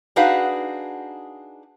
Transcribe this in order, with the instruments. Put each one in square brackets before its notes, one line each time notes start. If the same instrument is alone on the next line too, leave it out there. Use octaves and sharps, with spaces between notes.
[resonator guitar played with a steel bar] D4 D#4 F#4 G#4 B4 F5